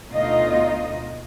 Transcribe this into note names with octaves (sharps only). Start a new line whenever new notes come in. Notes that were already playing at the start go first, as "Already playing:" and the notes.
D2 B2 D#4 F4 D#5